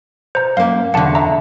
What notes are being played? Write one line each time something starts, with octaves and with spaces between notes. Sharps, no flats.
C5 A#5
F#2 A#3 F5
E2 D3 F#5 A5
E5 A#5